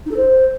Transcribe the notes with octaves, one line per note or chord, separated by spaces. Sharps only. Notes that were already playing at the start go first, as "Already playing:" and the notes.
D#4
A4
C5